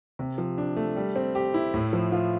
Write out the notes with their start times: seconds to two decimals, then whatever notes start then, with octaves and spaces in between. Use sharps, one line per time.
0.19 C3
0.38 F3
0.58 D4
0.76 A3
0.96 G3
1.16 C4
1.35 G4
1.54 E4
1.74 A2
1.93 F3
2.12 F4